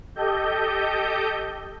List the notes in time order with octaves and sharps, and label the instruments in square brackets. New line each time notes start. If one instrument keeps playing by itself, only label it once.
[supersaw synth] G4 A4 D#5 G6